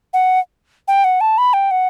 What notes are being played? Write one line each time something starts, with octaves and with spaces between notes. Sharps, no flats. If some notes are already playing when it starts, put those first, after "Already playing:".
F#5
G5
F#5
A5
B5
G5
F#5